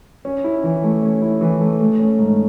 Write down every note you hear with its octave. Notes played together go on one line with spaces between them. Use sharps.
C#4
E4
E3
A3
C#4
E4
E3
A3
A3
C#4
G#2